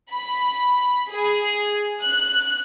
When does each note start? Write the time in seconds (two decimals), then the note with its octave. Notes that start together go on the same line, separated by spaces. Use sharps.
0.13 B5
1.13 G#4
2.04 F#6